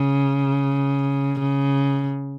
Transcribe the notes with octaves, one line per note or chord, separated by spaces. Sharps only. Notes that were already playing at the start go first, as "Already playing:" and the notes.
Already playing: C#3
C#3